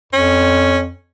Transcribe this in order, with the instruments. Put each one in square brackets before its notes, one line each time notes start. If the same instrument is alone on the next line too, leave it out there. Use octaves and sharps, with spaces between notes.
[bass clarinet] F2 [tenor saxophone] C#4